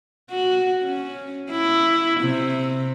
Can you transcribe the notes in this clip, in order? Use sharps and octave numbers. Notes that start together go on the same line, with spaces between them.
F#4
C#4
E4
C3